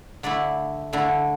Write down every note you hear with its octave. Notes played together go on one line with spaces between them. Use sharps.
D3 A3 E4 D5
D3 A3 E4